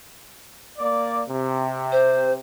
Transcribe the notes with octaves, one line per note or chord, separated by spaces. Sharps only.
A#3 D5
C3
C5